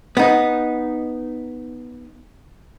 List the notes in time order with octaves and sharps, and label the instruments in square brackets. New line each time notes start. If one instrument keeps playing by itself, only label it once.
[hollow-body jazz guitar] B3 D#4